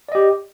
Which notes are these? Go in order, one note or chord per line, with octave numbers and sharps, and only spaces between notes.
G4 D5 D#5